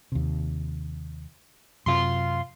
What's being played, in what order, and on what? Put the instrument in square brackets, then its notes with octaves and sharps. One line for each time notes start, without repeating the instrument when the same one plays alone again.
[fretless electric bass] D#2 C3
[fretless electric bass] F#2 C3 [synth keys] F4 C6